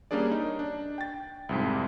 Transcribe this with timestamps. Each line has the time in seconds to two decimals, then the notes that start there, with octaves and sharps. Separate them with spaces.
0.11 G3 A#3 C#4 D4 G#4 D5
0.32 D#4
0.59 D4
0.98 G5 A6
1.49 C2 F2 G#2